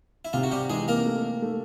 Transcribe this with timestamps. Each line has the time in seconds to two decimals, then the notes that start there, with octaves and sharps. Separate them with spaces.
0.25 E4
0.33 C3 F4
0.43 F#4
0.52 G3 G4
0.70 E3 G#3 G#4
0.88 A#3 A#4
1.06 A3
1.42 A3